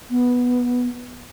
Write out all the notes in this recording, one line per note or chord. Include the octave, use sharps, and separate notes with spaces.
B3